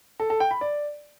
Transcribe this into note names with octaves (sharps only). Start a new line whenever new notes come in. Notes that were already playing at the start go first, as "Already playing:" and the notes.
A4
A4
G5
B5
D5